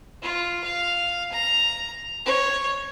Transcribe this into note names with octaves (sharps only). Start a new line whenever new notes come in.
F4
F5
A#5
C#5